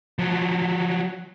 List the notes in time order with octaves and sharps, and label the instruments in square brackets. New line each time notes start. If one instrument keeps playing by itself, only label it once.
[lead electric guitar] F3 F#3